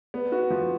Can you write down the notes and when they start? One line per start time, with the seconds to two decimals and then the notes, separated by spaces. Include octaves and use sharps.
0.14 B3
0.32 F#4
0.50 F3